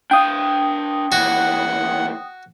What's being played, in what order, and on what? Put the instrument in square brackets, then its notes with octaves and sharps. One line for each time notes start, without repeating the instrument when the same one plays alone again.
[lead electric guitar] D4 F5 [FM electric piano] G5 D#6
[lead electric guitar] D#2 E3 [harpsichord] F#4 [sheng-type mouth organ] F#5